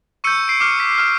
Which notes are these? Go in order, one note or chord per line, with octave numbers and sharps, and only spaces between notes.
C#6 E6 G6 C#7 D#7
C7 D7
D6 F6 C7
B6 C#7
D6 F6